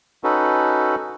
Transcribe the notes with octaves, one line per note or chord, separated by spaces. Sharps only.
C#4 D#4 F#4 A4 B4